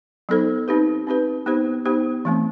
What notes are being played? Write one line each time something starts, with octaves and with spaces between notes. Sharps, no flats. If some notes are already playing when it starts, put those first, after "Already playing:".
F#3 B3 D#4 A4 C5
C4 D#4 G4 B4
C4 D#4 G4 B4
B3 D#4 G4 C5
B3 D#4 G4 C5
E3 A3 C4